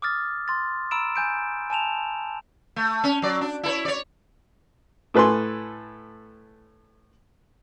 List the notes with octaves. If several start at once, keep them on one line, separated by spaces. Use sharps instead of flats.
D6 D#6 F6 A6
C6 A6
A#5 B5 E6 D7 E7
G#5 G6 D7
G#5 A5 E7 F7
A3
C#4
F#3 D5
D4
E4 A4 C#5
C#5 D5
A2 A4 B4 G#5 C6